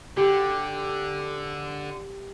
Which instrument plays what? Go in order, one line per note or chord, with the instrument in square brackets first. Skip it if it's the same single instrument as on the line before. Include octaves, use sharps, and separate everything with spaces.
[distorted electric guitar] D3 [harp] G4